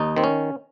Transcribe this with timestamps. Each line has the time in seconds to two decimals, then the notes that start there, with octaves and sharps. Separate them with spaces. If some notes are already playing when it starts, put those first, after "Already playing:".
Already playing: D#2 D#4
0.17 D#3 C4
0.24 C#4